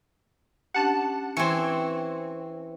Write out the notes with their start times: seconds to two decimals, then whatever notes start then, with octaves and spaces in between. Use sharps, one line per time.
0.74 C#4 D4 G4 F#5 A5 F#6
1.37 E3 C4 G#5 C#6